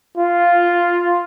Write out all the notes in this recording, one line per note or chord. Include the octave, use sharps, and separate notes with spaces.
F4